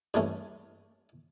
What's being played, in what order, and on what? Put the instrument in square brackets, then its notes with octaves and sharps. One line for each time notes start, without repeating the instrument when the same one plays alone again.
[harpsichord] G2 E3 A3 C#4